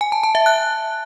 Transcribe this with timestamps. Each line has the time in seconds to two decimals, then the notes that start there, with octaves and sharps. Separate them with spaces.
0.01 G#5
0.12 A5
0.23 A5
0.35 E5
0.46 F#6